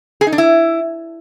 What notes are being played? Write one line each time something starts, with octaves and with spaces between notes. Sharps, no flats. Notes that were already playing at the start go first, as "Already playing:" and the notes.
G#4
D#4
D4
E4